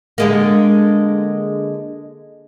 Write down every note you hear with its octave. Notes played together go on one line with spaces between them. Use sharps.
D3 G#3 A#3